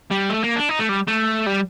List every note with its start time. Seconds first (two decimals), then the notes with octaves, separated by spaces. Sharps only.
0.11 G3
0.30 A3
0.44 A#3
0.56 D4
0.69 D#4
0.79 A3
0.89 G3
1.08 A3
1.47 G3